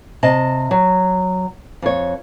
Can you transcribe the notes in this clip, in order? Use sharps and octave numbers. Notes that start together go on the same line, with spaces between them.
C3 D#5 A5
F#3
F2 C#5